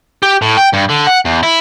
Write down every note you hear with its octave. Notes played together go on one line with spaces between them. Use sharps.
G4
A2
G5
G2
D3
F#5
E2
E4